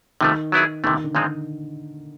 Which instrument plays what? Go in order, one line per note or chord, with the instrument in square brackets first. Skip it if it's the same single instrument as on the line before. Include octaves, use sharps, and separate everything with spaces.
[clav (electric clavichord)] C3 F3 A3 [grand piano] D#3
[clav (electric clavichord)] F#3 B3 E4 G#4
[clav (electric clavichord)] C3 E3 A3 [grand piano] D#3
[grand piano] D#3
D3
[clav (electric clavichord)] A#2 F3 G#3 C4 D#4 [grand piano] D#3